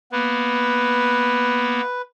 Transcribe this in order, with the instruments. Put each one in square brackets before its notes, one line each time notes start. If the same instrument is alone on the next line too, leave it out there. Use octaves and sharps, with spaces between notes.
[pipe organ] A#3 B3 [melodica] B4